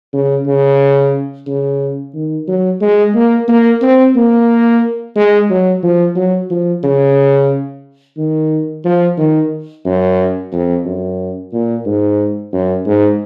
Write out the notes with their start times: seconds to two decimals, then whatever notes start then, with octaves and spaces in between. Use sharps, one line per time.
0.13 C#3
0.46 C#3
1.47 C#3
2.14 D#3
2.48 F#3
2.81 G#3
3.15 A#3
3.48 A#3
3.82 C4
4.15 A#3
5.15 G#3
5.50 F#3
5.83 F3
6.16 F#3
6.50 F3
6.83 C#3
8.17 D#3
8.85 F3
9.17 D#3
9.85 F#2
10.52 F2
10.86 F#2
11.53 A#2
11.86 G#2
12.53 F#2
12.86 G#2